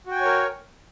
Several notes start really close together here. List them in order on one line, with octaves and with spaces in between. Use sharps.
F#4 G5 G#5 C#5 A#4